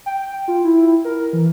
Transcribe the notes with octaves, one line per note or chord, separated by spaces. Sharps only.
G5
F4
E4
A#4
E3